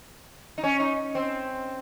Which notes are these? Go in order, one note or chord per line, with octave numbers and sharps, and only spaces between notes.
D#4
C#4
D#4
C4